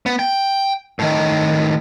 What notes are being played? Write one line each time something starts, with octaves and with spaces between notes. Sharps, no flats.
B3
G5
A2 D#3